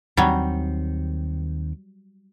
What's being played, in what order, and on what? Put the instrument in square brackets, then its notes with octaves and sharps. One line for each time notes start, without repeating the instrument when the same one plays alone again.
[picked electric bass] D#2 D#3 C4 [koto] F#3 G3